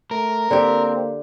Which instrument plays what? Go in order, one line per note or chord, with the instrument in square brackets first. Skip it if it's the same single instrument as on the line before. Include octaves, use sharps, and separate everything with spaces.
[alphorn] A3 [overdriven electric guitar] A#4
[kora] D3 G4 [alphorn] A#3 [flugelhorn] C4